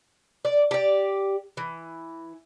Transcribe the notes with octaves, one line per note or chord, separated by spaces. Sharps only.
D5
G4 D5
E3